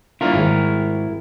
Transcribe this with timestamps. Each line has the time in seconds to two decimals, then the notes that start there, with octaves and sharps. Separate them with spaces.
0.21 A#3 D4 E4 F4 A#4
0.34 G#1